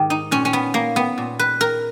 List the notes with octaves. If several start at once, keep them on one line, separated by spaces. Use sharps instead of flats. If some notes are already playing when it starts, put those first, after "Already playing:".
Already playing: G#2 D#3 G4
D#4
A#2 C#4
C#4
B3
A#3
B3
A#2
B4
A#4